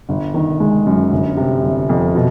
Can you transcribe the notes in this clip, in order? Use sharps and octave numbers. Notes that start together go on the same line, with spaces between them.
G1
D#3
G#3
F#2
G1
C3
G1
F2
B2